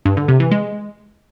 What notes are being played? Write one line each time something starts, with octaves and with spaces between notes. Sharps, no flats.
G2
D3
C3
E3
G#3